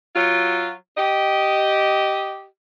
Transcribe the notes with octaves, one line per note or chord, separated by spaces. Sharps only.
F#3 F4
G4 D#5